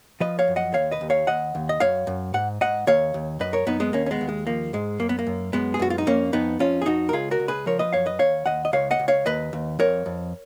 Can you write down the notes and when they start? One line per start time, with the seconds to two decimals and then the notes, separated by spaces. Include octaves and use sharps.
0.20 F3 B4 D#5
0.39 C#5 F5
0.48 F#2
0.56 D#5 F#5
0.74 D#2 C#5 F5
0.91 B4 D#5
1.01 D#2
1.10 C#5 F5
1.27 D#2 D#5 F#5
1.55 D#2
1.69 D#5
1.80 F#2 C#5 F5
2.07 F#2
2.34 G#2 F#5
2.61 G#2 D#5 F#5
2.87 D#2 C#5 F5
3.14 D#2
3.40 F#2 B4 D#5
3.53 A#4 C#5
3.66 F#2 B3 D#4
3.80 G#3 B3
3.93 D#2 A#3 C#4
4.06 C#4
4.11 G#3 B3
4.21 D#2
4.29 G#3
4.47 F3 A#3
4.73 G#2 G#3
5.00 F#2 A#3
5.09 B3
5.19 A#3
5.27 F#2
5.53 F#2 G#3 B3
5.74 G#4
5.79 F#2 F#4
5.90 F4
5.98 D#4
6.07 F2 A#3 C#4
6.33 F2 B3 D#4
6.59 F2 C#4 F4
6.82 G#4
6.86 F2 D#4 F#4
7.09 A#4
7.13 C#2 F4 G#4
7.31 F#4 A#4
7.40 C#2
7.48 G#4 B4
7.66 F3 A#4 C#5
7.79 B4 D#5
7.93 F#2 C#5 F5
8.06 B4 D#5
8.19 D#2 C#5 F5
8.46 D#2 D#5 F#5
8.65 D#5
8.73 C#2 C#5 F5
8.91 D#5 F#5
8.99 C#2
9.08 C#5 F5
9.26 D#2 B4 D#5
9.53 D#2
9.79 F2 A#4 C#5
10.06 F2